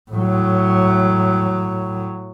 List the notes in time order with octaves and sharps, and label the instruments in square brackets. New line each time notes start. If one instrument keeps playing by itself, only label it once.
[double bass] A2 F#3